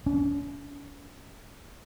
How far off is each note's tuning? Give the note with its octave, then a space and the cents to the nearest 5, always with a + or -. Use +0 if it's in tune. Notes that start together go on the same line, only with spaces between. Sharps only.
C#4 +45